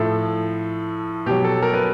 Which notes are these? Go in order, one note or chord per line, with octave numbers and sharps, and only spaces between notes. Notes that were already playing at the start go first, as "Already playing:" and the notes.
Already playing: A2 F3 A4
B2 F#3 G4
A4
A#4
B4